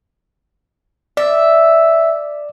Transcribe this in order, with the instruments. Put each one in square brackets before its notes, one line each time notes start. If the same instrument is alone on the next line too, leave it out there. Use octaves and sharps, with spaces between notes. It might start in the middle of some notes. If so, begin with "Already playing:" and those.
[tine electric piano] D5 [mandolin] E5